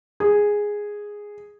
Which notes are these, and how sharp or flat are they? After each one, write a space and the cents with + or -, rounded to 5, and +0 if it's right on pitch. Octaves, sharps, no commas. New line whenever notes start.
G#4 -5